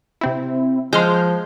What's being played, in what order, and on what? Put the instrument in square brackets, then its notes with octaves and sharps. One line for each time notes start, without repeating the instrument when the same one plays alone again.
[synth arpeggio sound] C3 C4 E4
[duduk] F3 [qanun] G#3 [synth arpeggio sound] C6 F6 G6